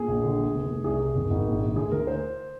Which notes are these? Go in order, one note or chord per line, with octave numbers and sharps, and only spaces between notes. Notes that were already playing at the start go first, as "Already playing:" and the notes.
Already playing: A#2 G#4
A#1
D3
D2
F1
F1
C2 G#4
C2
G#1
G#1
A#1
A#1
D2 G#4
D2 A#4
C5